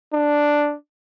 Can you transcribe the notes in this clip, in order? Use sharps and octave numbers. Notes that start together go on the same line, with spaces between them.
D4